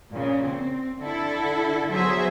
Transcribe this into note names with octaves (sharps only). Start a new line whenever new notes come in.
A#2 C#3
C4
D3 E4 A4
F#3 B3 G#4 C5 E5